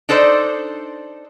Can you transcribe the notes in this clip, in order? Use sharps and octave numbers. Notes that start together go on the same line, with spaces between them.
D4 D#4 A4 C5 D5